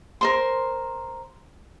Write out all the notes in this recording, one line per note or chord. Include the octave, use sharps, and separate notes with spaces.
A#4 C5 C6